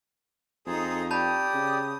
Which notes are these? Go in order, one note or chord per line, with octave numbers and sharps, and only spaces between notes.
F2 D#4 G#4 A4 C5 A#5 D#6
G4 D5 A5 B5 D#6 G6
C#3